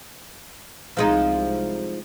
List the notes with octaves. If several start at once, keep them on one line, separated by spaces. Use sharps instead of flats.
C2 F3 G#3 D#4